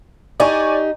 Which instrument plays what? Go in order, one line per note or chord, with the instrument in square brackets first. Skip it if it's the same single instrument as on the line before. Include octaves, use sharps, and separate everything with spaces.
[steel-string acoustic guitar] D#4 G4 [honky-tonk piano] D5 G#5 C#6